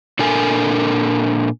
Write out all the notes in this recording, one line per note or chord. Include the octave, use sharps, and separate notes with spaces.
A#2 D4 A4 A#4 G#5